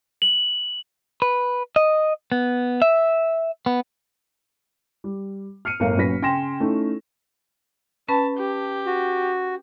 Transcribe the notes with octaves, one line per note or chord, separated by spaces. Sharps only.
F#7
B4
D#5
B3
E5
B3
G3
F6 C7 C#7 D#7
G1 A2 A#4 F5 C#7
A#2 F#3 C#4 B4 A#6 B6
C#3 G5 G#5 C6 A#6 E7
A3 C#4 D#4 E4
C#4 B4 A5 B5
G4
F#4